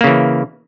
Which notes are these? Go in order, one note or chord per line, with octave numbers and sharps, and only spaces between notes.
C#3 E3 A#3